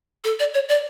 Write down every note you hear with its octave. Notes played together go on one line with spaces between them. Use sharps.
A4
D5
C#5
D5